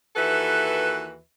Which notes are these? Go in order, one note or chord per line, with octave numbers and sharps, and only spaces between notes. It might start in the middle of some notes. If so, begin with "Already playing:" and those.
D#2 E3 F#4 A4 B4 E5